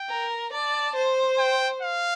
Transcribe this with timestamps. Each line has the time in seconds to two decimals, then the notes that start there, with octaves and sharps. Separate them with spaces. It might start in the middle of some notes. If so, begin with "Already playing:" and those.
Already playing: G5
0.10 A#4
0.52 D5 A5
0.95 C5
1.39 G5
1.82 F5